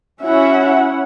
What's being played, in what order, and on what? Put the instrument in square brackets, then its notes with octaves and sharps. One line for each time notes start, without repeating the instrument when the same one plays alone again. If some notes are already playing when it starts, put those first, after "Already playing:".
[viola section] C#4 E4 F#5 [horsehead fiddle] F#4 E5